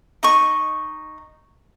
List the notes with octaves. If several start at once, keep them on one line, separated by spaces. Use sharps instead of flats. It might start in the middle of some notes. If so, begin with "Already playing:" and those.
D#4 D#5 C#6